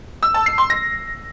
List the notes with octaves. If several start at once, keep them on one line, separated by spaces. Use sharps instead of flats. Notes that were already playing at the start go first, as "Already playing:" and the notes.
E6
A5
C7
C6
A#6